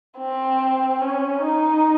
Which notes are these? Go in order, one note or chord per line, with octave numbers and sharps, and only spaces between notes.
C4
C#4
D#4